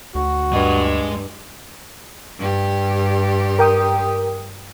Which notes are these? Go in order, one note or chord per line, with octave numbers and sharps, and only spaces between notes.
D2 F#4
G2 G#3 D#5
G2 G4
A#4 G5 D#6